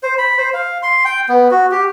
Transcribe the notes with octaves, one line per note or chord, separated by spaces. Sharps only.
C5
B5
C5
F5
C6
G5
B3
F#4
G4